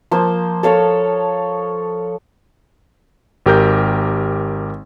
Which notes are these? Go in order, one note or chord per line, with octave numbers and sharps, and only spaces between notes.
F3 A#3 C5
A4 C#5 F5
G#1 G4 A#4 G6